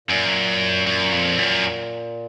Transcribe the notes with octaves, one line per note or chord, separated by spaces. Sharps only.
F#2 A#2
F#2
F2
F#2